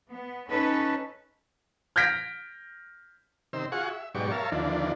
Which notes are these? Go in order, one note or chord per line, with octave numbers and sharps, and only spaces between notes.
B3
C#4 D#4 A4 B4
F6 G6 G#6 A#6 B6 D7
C3 D#3 C5 E6
F4 F#4 G#4 F#5 C#6
E5
G#2 B2 F#3 G4 D5 C#6
A#4 C#5 E5 F5 A5
D#2 D3 E3 F3 D4